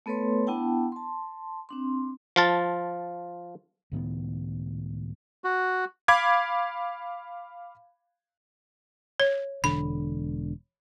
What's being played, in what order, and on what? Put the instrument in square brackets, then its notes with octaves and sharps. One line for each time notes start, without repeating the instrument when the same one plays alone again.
[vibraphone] A3 B3 A4 B4 C#5 C6
B3 D4 E4 F#5 G5 A5
A5 C6
C4 D4 C6
[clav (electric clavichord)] F3 F4 A5
[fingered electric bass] C#2 A2 D#3 B3
[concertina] F#4
[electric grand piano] F5 B5 D6 G#6
[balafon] C#5
[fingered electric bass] E1 D3 [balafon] B5